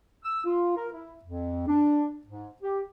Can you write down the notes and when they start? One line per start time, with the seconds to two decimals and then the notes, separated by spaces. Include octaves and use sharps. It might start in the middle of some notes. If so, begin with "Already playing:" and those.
0.24 E6
0.45 F4
0.77 A#4
0.93 E4
1.24 F2
1.67 D4
2.27 G#2
2.63 G4